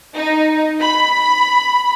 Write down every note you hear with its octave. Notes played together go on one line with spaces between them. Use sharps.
D#4
B5